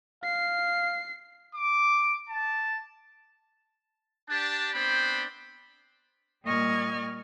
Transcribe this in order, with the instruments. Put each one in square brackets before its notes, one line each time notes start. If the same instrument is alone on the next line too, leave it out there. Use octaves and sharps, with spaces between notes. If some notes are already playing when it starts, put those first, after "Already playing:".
[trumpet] F5 [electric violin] C7
[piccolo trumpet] D6
A5
[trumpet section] D4 G4 A5
B3 C4 D4 C5 G5 B5
[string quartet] A#2 G3 D#5 C#6 F6 G#6